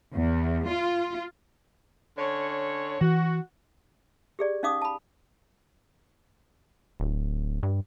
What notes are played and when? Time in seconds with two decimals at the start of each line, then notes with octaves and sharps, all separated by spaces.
0.13 E2
0.67 F4
2.18 D3 C#4 C#5
3.01 E3 F#4
4.39 G4 G#4 D5
4.63 C#4 D#4 F5 D6 D#6
4.82 A5 B5
7.00 D1
7.63 G2